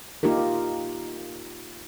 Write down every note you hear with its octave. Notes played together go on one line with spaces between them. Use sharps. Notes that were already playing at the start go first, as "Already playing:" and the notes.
A#3 D#4 F4 G4 A#4